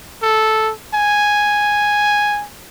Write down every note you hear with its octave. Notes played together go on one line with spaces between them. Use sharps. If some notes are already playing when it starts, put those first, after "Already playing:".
A4
G#5